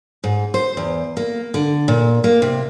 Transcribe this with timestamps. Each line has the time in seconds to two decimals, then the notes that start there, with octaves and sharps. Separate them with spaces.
0.24 G#2
0.54 C5
0.77 E2
1.17 A#3
1.54 D3
1.88 A#2
2.24 A#3
2.42 C3